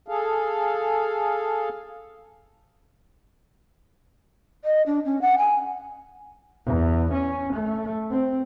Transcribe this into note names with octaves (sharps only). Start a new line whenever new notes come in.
G#4 A4 F5
D#5
D4
C#4
F#5
G#5
E2
C#4
A3
C4